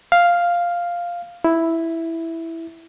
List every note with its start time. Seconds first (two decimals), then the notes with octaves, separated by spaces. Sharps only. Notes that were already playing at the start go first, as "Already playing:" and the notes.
0.12 F5
1.44 E4